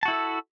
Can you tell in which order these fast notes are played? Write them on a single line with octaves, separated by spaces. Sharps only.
A5 F#4 E4 A4 E5